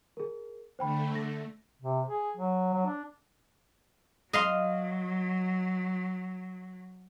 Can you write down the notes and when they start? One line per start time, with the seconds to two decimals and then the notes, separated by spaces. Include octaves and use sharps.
0.17 G#4 A#4
0.79 D3 A3 C5 G5 B5
1.15 A#6
1.82 C3
2.08 G#4
2.37 F#3
2.74 F#3
2.86 D4
4.33 F#3 D#5 F5 C6